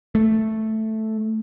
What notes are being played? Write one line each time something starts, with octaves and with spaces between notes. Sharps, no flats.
A3